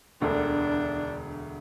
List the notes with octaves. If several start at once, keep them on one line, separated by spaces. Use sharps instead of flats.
E1 D2 D3 D4